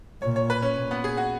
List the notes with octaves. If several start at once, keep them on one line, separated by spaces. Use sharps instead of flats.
A#2 C#5
C#5
B4
C#4
A#2
B3
G#4
F#4